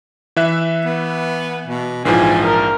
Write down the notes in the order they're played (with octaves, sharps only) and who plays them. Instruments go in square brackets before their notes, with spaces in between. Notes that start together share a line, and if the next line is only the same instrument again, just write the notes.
[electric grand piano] E3 E5 F#6
[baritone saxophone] B3
B2
[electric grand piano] A#1 G#2 F3 [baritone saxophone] E3 [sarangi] G#5
[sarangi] A#4